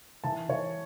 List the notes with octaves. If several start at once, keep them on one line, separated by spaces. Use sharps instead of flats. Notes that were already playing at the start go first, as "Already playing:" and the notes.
E3 A5
E3 C#5